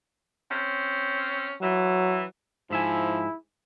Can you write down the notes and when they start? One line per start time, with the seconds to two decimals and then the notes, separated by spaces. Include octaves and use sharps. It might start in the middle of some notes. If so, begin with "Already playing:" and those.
0.51 C4 C#4
1.62 E3 F#3
2.71 G#2 F3 E4 E5 G#5